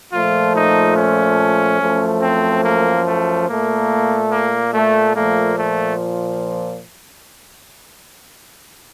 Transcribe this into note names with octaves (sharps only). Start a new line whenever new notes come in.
A#2 F3 A3 F4
D#4
C#4
F#2 F3 A3
C4
A#3
A3
A#2 A3 A#3
A#3
A3
A#2 F3 A3 A#3
A3